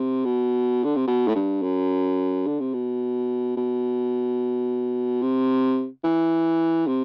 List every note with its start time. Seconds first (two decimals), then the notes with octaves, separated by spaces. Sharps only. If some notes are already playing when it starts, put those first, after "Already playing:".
Already playing: C3
0.25 B2
0.84 D3
0.96 C3
1.08 B2
1.28 A2
1.35 G2
1.62 F#2
2.47 D3
2.60 C3
2.74 B2
3.57 B2
5.22 C3
6.04 E3
6.87 C3